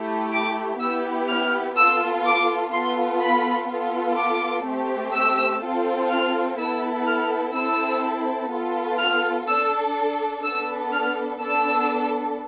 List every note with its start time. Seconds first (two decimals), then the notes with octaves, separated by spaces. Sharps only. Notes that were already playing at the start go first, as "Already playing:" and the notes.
Already playing: A3 E4 G4
0.32 D6
0.79 B3 E4 G4 E6
1.28 F6
1.76 B3 F4 A4 E6
2.25 D6
2.72 B3 F4 A4 C6
3.20 B5
3.69 B3 F4 A4
4.17 D6
4.66 A3 C4 G4
5.13 E6
5.62 C4 F4 A4
6.10 F6
6.59 B3 E4 A4 E6
7.07 F6
7.55 C4 E4 A4 E6
8.51 B3 F4 A4
8.99 F6
9.48 D4 A4 E6
10.44 B3 D4 A4 E6
10.93 F6
11.41 B3 D4 A4 E6